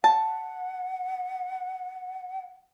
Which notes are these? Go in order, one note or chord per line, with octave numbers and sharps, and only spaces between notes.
F#5 A5